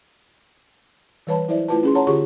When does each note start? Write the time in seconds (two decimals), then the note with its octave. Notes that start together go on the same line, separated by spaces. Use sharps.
1.27 E3 G3 B4 C#5 A5 B5
1.48 F#3 E4 C5 D5 E5
1.68 A3 E4 F4 B4 A5
1.83 C#4 G#4 C6
1.95 C#5 F#5 A5 A#5 C6
2.07 D3 F4 G4 G#4 C#5 C#6